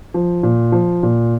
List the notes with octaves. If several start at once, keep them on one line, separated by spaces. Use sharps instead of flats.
F3
A#2
F3
A#2